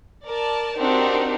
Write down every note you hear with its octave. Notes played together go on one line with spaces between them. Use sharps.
A#4 D5 A5
C4 D4 D#4 F#4 G4 A#4